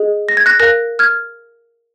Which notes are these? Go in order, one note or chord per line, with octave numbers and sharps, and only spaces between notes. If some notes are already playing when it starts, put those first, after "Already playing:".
Already playing: G#4 D#5
A#6
G#6
F#6 A#6
A#4 F5 F#6 A#6
F6 G#6